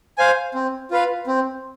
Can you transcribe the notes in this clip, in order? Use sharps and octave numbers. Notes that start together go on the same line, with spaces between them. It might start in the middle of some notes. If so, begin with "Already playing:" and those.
C5 F5 G#5
C4
F4 B4 F5
C4